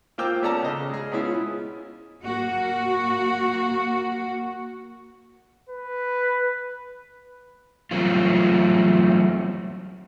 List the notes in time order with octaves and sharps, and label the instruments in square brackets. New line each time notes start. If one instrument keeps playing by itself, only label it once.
[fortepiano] A#3 F4 C5 G5 D6 E6
B3 C#4 A4 D5 A5 A#5
C#3 D#5
G#3 G#4
G#3 B3 C#4 E4 F4
[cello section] A#3 F#4
[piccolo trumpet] B4
[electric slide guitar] E3 F#3 G3 A3 C4 F4